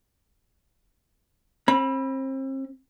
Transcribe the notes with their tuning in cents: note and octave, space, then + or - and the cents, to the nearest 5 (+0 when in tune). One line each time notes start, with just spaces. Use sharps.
C4 +35 B5 -15